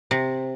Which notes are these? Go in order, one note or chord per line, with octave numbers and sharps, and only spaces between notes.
C3